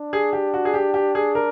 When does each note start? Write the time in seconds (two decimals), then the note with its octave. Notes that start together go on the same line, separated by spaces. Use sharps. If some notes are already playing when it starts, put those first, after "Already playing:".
Already playing: D4
0.13 G#4
0.33 G4
0.54 F#4
0.65 G#4
0.74 G4
0.94 G4
1.15 G#4
1.35 A#4